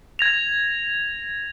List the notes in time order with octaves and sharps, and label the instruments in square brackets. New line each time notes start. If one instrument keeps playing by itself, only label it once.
[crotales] G#6 A#6 F7